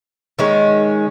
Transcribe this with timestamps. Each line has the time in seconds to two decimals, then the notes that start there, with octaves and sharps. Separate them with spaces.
0.39 D#3 G#3 C#4